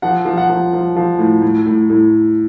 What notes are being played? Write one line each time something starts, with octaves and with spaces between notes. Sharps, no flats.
F3 F#5
F3
F#5
F3
F3
F3
A2
A2
A2
A2